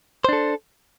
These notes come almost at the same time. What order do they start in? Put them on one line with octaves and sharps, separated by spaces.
C5 D4 A4